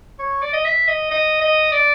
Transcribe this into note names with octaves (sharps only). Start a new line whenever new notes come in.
C#5
D5
D#5
E5
D#5
D#5
D#5
D5